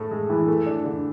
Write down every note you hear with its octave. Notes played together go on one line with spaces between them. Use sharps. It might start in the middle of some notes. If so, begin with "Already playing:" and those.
Already playing: A2 A4
G#3
E3
A3
D4
D3